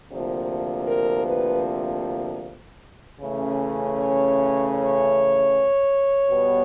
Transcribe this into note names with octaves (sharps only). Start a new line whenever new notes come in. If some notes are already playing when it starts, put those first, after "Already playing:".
D2 C3 F3 A#3
A#4
B4
C#3 E3 A3 C#4
C#5
C#5
B2 G3 B3